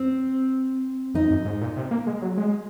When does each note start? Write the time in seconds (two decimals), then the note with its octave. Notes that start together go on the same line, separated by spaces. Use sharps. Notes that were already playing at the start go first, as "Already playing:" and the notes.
Already playing: C4
1.14 F2 D#4
1.31 F#2
1.45 G#2
1.61 A#2
1.76 C3
1.91 A#3
2.07 G#3
2.22 F#3
2.38 G#3